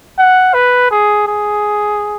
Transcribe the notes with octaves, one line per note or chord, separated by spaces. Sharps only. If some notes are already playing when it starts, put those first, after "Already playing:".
F#5
B4
G#4
G#4